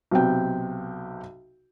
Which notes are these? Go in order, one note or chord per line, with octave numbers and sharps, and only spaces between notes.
B1 C3 G5